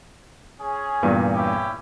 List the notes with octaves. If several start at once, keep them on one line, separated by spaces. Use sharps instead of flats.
C#4 G#4
E2 G2 A#2
C#4 E4 G4